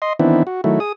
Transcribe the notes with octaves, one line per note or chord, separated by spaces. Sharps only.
D#5 C6
D#3 E3 B3 C4 D4 E4
F#4
D#3 F#3 A3 E4
G#4 D#6